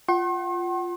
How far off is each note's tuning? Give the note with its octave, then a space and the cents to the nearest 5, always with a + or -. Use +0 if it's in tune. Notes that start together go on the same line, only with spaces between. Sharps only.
F4 +0 F#5 +40 C6 +45